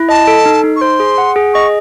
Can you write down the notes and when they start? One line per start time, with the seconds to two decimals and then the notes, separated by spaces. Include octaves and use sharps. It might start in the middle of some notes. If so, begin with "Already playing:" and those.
Already playing: E4
0.09 D#5 A5
0.27 A4
0.46 D#4
0.64 D#4
0.76 C#6
0.81 C5 C6
1.00 G#4
1.18 F#5
1.36 G#4
1.54 D#5 C#6